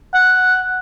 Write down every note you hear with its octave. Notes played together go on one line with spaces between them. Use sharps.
F#5